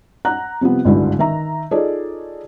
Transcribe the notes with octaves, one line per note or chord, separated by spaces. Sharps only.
F#5 A#5 F#6
C3 F3 G3 B3
G1 C#2 G#2 D3 E4 F#4
D#3 E5 A#5
D#4 F4 G#4 A4 C#5 D5